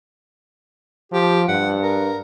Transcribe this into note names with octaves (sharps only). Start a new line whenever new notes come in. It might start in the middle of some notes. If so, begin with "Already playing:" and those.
F3 G4
G2 F#5
A#4